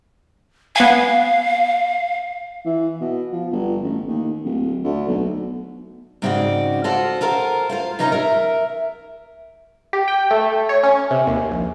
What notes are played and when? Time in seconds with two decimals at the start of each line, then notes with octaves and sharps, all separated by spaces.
0.76 B3 F5 G#5
2.65 E3
3.01 B2
3.32 F3
3.51 G1
3.83 A1
4.08 D#2
4.44 D1
4.84 D2
5.08 B1
6.22 G#2 C#3 C4 D4 F#4 D5
6.84 F4 F#4 A4 C5 F5
7.21 F4 A4 A#4 C5 F5
7.69 F4 C5 F5
7.99 C3 C#4 D#4 F4 G#5 A#5
8.12 A#4 E5
9.93 G4
10.08 G5
10.31 A3
10.69 C#5
10.83 C#4
11.11 C3
11.27 D#2
11.51 A#1